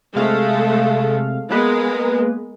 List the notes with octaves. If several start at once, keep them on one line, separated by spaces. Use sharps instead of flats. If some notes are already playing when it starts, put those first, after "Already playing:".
C3 G#3 A3 A4 F5
G#3 A#3 B3 A#4 B4